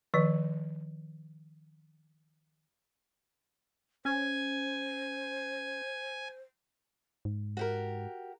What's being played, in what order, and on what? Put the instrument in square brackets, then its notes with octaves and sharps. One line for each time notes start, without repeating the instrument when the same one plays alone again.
[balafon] D#3 F3 B4
[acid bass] C#4 [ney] C5 [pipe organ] G#5
[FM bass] G#2
[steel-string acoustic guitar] F#4 G4 A#4